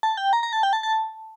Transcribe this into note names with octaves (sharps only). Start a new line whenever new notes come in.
A5
G5
A#5
A#5
A5
G5
A5
A5